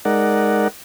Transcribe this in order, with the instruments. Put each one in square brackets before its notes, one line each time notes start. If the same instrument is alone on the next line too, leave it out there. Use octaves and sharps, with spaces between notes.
[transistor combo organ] G#3 D#4 A#4 D5 F#5